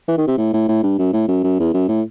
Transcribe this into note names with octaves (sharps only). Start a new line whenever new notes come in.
E3
D#3
C3
A2
A2
A2
G2
F#2
A2
F#2
F#2
E2
F#2
A2